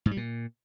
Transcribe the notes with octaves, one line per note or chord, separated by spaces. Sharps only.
G#2
G3
A#2